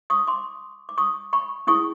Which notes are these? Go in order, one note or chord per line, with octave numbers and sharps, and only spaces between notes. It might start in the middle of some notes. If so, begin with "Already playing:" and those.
C#6 D#6
C6 D6
D6
C#6 D#6
B5 C#6
C#4 E4 G#4 C#6 D#6